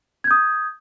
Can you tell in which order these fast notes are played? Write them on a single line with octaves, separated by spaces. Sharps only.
G#6 G6 D#6